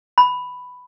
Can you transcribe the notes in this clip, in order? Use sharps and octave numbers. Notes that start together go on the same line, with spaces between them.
B5